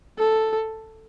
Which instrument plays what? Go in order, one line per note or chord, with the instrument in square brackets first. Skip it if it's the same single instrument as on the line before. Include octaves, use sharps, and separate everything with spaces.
[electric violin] A4